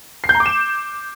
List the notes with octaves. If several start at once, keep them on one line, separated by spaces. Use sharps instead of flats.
C7
G6
A#5
D6
E7